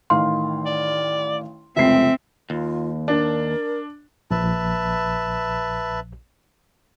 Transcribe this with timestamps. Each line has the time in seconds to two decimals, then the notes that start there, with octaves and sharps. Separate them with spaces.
0.10 A1 D#3 F5 C6
0.66 D5
1.77 F1 C#2 C4 E5 C7
2.50 D#2 F4
3.08 D4 A#4
4.31 A#1 B4 E5 A5